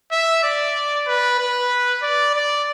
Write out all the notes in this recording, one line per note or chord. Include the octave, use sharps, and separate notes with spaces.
E5
D5
B4
B4
D5
D5